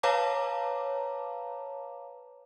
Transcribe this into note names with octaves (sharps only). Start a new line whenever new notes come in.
B4 C#5 F5 A5 A#5 D6